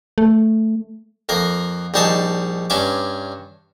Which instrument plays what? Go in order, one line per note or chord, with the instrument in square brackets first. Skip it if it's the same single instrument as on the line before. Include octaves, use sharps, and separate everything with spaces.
[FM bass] A3
[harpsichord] F2 A#3 A#4
A#1 G3 D#4 G#4 A5
G2 C#4 E5 D6